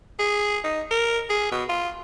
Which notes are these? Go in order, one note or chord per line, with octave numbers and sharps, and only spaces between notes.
G#4
D#4
A#4
G#4
B2
F4